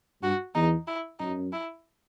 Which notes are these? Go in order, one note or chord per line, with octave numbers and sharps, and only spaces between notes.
G2 F#4
E2 D#4
E4
F#2 D#4
E4